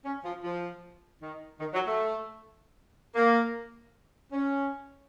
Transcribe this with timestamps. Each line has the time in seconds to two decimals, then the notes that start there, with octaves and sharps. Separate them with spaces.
0.05 C#4
0.25 F3
0.44 F3
1.21 D#3
1.60 D#3
1.74 F#3
1.87 A3
3.15 A#3
4.32 C#4